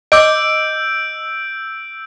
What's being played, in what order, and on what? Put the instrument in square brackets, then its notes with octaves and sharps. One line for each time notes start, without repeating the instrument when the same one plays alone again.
[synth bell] D#5 D6 [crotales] E6 G6 D7